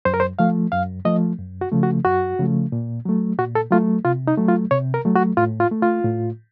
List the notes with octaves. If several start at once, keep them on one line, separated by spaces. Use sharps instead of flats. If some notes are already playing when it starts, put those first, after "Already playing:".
F#2 C5
A#4
C5
F3 A3 F5
F#2 F5
F3 A3 D#5
F#2
F#4
C#3 F3 A3
F#4
F#2 F#4
C#3 F3 A3
A#2
F#3 A3
A#2 F#4
A4
F#3 A3 F4
C3 F4
D#4
F#3 A3
F4
C3 C#5
A#4
F#3 A3
F#4
A2 F4
F4
A3
F4
A2